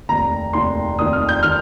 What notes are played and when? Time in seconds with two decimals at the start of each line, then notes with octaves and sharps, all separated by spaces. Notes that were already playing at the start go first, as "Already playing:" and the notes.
0.09 F1 D#2 D#3 A#5
0.53 F1 D#2 D#3 C6
0.99 F1 D#2 D#3 D#6
1.13 F6
1.29 G6
1.43 D#3 F6